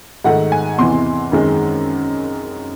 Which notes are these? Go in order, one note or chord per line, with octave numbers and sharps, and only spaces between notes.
G#2 D#3 A3 F#5
G#5
E2 C3 E3 C6
F#2 D#3 G#3 C4